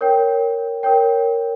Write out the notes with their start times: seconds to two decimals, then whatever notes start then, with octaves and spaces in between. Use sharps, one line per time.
0.01 A#4 C#5 G5
0.83 A#4 C#5 G5